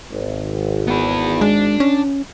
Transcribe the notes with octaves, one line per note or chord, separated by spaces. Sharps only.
G#1
B3 E4
G#3 D4
C#4